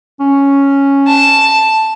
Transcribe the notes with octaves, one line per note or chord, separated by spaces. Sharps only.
C#4
A5